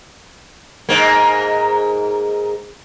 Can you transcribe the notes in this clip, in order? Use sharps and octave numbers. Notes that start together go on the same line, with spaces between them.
G#2 A#3